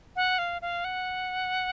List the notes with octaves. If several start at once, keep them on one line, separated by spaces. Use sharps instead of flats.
F#5
F5
F5
F#5